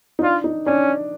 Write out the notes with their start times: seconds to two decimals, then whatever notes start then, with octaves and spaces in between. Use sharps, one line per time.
0.19 D#4
0.23 D4 F4
0.44 D#4
0.66 C#4 D4